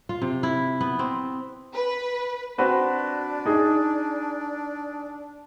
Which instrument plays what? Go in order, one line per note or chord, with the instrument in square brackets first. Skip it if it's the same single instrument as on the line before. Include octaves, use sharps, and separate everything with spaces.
[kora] F4
C3
E4
B3
C4
[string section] B4
[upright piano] C4 F#4 B4 [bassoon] D4
[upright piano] D#4 G#4